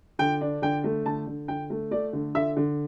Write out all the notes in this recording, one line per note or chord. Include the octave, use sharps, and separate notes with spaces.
D3 G5
D4
D3 G5
A3
D3 A5
D3
D3 G5
A3
A3 D5
D3
D3 E5
D3